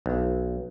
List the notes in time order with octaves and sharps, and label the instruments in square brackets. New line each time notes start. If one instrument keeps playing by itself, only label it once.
[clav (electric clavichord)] B1